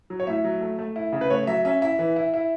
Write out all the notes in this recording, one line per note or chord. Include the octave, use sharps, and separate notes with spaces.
F#3
C#5
A2 E5
F#3
A3
A3
E4
C#3
B4
A3 C#5
F#3 E5
C#4 E5
E4 E5
E3
E4
E4